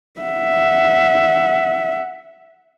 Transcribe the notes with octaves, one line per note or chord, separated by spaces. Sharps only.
E5 F#5